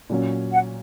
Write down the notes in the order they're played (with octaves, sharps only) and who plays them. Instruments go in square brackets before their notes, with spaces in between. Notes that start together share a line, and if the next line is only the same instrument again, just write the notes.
[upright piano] A#2 F#3 C#4
[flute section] F#5